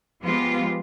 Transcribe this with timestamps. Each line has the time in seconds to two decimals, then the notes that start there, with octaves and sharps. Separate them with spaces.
0.22 F3 G#3 B3 F4 G4